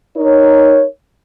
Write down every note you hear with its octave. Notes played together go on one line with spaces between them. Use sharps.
D#4 A#4 C#5